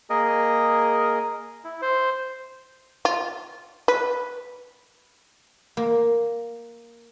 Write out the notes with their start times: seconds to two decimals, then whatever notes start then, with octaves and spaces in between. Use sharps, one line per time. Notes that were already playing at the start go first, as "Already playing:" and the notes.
0.10 A#3 G#4 A#4 D#5
1.64 E4
1.82 C5
3.05 F4
3.88 B4
5.77 A#3